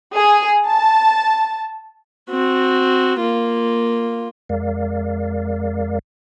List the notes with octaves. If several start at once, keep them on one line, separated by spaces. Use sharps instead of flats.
G#4
A5
C4 F#4
A#3 F4
F2 G#3 A#4 D5 F5